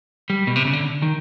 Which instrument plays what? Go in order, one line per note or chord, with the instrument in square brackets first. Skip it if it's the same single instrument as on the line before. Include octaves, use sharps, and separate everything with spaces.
[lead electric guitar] G3
B2
C3
C#3
D3
D#3